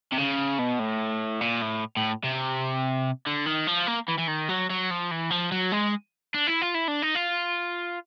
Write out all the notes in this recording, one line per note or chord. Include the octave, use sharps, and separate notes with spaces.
C3
C#3
B2
A2
A#2
A2
A2
C3
D3
D#3
F3
A#3
E3
E3
D#3
F#3
F#3
F3
E3
F3
F#3
G#3
D4
E4
F4
E4
D4
D#4
F4